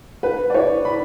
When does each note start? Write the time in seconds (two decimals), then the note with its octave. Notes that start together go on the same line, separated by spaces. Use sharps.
0.23 B4
0.50 D5
0.54 C#5
0.85 B5